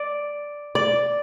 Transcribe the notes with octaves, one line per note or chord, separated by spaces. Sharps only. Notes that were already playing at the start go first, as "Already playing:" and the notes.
Already playing: D5
D5